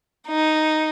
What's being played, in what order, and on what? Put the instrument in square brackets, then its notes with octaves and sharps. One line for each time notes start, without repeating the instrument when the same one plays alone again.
[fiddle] D#4